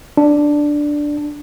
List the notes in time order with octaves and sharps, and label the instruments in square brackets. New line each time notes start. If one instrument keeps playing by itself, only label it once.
[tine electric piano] D4